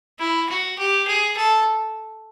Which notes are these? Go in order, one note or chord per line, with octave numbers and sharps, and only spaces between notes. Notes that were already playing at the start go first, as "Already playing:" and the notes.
E4
F#4
G4
G#4
A4